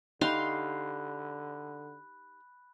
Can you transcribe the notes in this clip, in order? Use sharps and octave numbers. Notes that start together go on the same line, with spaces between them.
D3 D#4 G4 F5 B5 C6 F#6